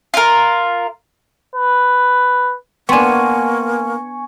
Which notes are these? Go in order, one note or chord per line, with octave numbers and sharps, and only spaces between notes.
F4 A#4
B4
A#3 B3 D4 G5 G#5 C6 C#6 D#7